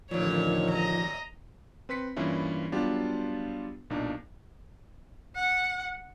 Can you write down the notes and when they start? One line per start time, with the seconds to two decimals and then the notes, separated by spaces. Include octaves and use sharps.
0.11 A1 D#2 A#2 D3 D#3 F3 C#5
0.70 D#5 A#5
1.89 C4 B4 C6 B6 C#7
2.16 G2 E3 A#3 C#4 E4 F4
2.72 F#3 G3 B3 D4 F4 G4
3.90 B1 A#2 D4 D#4
5.35 F#5